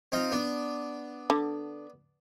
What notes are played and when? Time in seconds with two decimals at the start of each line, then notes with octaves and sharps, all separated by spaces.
0.12 C4 D#4 F4
0.31 B3 D4
1.30 D3